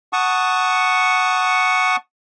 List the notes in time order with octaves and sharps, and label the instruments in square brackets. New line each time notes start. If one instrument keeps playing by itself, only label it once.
[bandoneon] F#5 A5 C#6 D#6